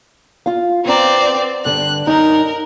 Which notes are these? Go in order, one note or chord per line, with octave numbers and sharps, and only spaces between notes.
F4 F5
B3 C4 D5 A#5
G2 D3 D4 F#6
F#2 D#4 A#4